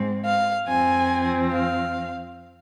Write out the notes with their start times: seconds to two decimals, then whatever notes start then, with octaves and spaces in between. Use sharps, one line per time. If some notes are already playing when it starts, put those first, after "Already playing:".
Already playing: G#2 G#3 C4
0.25 F5
0.67 F2 F3 C4 G#5
1.52 F5